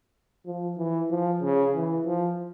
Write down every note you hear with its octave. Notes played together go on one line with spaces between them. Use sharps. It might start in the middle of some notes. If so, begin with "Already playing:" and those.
F3
E3
F3
C#3
E3
F3